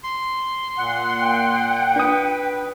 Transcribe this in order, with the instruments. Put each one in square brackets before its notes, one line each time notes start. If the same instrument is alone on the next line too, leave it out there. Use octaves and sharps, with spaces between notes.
[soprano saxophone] C6
[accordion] A#2 F#5
[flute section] G5
[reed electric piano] D4 D#6 [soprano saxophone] B4